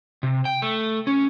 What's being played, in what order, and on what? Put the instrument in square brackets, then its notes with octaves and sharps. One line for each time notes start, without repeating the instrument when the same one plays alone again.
[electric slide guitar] C3
G5
A3
C#4